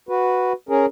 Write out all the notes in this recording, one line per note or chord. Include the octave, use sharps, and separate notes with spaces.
F#4 B4
C#4 G#4 A#4